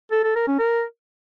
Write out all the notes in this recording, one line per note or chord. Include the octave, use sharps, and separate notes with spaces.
A4
A4
A#4
C#4
A#4